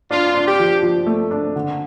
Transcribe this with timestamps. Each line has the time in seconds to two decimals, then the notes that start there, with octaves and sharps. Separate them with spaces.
0.11 D4 F4
0.35 D4
0.47 G4
0.60 F3
0.83 F3
1.06 A3
1.31 D4
1.56 D3